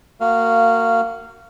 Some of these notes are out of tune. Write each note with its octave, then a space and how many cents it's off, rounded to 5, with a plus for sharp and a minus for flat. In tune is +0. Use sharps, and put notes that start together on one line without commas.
A#3 -25 F#4 +0 F5 -15